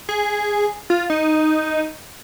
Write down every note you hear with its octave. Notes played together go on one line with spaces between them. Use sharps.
G#4
F4
D#4